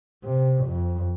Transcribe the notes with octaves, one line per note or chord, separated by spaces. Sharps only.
C3
F2